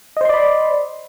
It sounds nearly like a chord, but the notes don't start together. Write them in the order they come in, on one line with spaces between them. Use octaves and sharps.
D#5 C5 C6 D5 B5